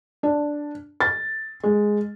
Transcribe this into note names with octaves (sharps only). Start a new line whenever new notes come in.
D4
A6
G#3